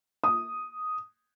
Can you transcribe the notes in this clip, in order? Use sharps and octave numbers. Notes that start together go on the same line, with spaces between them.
D#6